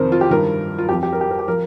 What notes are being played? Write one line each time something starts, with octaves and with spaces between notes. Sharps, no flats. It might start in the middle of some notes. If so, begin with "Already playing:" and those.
Already playing: F2 C3 D#3 A#4 C5
F4
G4
G2 D#3 A#4
F4
F2 F3 G4
G4
A#4
G4
A#4
G4
F3 A#4